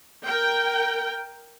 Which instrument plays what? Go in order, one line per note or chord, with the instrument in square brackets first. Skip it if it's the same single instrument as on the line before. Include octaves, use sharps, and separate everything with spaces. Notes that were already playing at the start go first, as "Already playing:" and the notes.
[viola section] A#4 G5